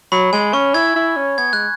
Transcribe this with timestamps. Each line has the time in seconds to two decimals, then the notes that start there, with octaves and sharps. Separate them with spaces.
0.12 F#3 B5
0.33 G#3 G#5
0.53 C#4 C#6
0.74 E4 G#6
0.96 E4
1.16 C#4
1.38 B3 G#6
1.53 G#3 F#6